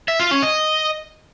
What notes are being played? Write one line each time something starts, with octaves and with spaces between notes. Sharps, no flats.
E5
F4
C#4
D#5